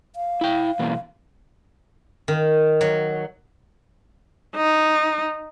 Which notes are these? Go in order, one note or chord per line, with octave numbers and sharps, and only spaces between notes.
F5
E4 G5
B2 E3 A#3
D#3
F#3
D#4